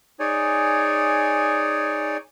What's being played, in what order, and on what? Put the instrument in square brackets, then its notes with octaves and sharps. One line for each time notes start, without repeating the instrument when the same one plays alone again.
[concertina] D#4 G#4 C#5 D5 G#5